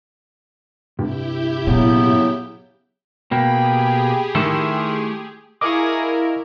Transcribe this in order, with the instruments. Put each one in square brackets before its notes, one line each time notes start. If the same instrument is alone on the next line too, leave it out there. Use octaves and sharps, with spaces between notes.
[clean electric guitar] C2 G2 [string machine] E4 G4 G5
[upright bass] A#2 [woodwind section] C#3 F#3 B3
[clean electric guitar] B2 A#3 [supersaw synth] G4 G#4 [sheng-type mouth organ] G5 B5
[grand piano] D#3 [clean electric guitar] A3 E4 A4 [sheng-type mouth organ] C6
[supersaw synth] E4 A#4 [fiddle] G#4 G#5 [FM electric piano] D#5 F5 C#6 [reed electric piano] D6